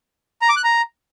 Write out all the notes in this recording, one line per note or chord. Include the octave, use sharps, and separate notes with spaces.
A#5
D6
F#6
A#5